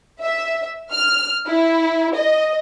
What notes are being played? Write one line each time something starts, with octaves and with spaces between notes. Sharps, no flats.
E5
F6
E4
D#5